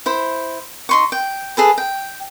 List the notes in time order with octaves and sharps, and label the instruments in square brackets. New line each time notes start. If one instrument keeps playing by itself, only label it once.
[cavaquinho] E4 C5
D#4 C6 C#6
G5
G#4 A4 B4
G5